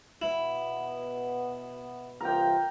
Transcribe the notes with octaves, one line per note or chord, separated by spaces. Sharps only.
B2 B3 E4
C2 E3 F4 A#4 G5